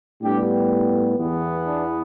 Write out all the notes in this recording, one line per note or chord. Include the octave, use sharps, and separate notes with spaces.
A2 G3 B3 D4 G4
E2 E3 B3
D4